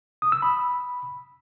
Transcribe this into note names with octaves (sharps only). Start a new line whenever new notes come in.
D#6
E6
B5